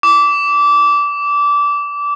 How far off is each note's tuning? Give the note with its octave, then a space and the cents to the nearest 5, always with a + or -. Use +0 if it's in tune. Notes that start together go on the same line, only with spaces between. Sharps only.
D6 -20